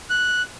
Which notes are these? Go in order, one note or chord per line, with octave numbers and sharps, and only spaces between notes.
F#6